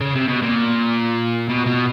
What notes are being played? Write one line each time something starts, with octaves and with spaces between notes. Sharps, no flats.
C#3
C3
B2
A#2
B2
B2